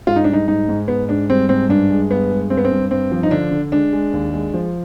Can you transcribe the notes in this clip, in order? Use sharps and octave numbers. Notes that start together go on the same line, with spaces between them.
G#2 F4
D#4
D4
G3
D#4
G#2 D#4
G#2
G#2 B3
G#2 D4
G3 C4
G#2 C4
G2 D4
G#3
G2 B3
G#3
G2 C4
B3
C4
G2
G2 C4
F3
D#4
D3 D4
D3
G#3 D4
G#3
D#2
G#3
F3